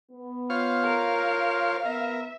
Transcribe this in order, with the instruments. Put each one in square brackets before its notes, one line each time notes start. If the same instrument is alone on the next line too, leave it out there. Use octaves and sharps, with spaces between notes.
[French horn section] B3
[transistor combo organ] F4 C5 C#5 [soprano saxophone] F5
[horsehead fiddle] A#4
[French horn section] B3 [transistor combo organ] A#4 [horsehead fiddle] E5